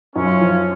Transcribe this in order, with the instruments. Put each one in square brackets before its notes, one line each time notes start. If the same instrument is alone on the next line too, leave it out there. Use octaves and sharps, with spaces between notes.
[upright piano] F#2 [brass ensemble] C#4 F4
[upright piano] F3